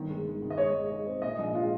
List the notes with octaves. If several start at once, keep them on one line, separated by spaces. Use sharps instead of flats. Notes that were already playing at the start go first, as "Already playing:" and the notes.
Already playing: G1 D#3
G#3
G#3
D#3
D#5
G#3 C#5
G#3
G#3
C4
A#2 D#5
A#1
G#3 F4